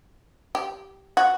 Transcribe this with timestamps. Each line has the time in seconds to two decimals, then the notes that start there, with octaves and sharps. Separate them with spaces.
0.55 G4
1.17 F#4